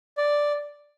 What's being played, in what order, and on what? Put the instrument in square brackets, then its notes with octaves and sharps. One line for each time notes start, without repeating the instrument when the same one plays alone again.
[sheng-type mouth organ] D5